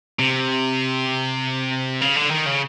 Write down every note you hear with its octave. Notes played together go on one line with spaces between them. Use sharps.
C3
C#3
D3
D#3
C#3